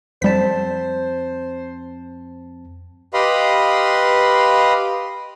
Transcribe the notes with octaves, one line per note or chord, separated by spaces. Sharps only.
F2 G3 C4 C5 A5 B6
G4 B4 D#5 F5 B5 C6